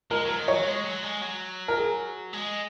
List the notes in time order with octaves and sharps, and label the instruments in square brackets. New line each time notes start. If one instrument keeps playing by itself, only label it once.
[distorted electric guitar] G#3 [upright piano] A#4
[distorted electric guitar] F#3 [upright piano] A#4
[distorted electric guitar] D#3
[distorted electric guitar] F#3 [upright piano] C#5
[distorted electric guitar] G#3
F#3
G#3
F#3
[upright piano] A#4
G#4
[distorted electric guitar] G#3